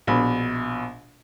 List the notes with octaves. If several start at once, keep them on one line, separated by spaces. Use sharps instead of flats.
A#1 B2 B5